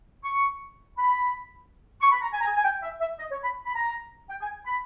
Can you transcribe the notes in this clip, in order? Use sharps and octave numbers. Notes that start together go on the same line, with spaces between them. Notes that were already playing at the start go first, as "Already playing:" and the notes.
C#6
B5
C#6
B5
A#5
G#5
A#5
G#5
G#5
G5
E5
E5
D#5
C#5
B5
B5
A#5
G5
G#5
B5